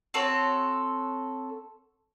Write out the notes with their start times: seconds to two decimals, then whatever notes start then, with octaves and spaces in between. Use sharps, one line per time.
0.14 C4 F#4 A4 C#5